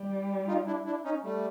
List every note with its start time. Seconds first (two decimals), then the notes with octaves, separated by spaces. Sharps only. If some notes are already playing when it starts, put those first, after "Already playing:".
Already playing: G3
0.48 D#4 F4
0.66 D4 E4
0.85 D4 E4
1.04 C#4 D#4
1.23 G3 A3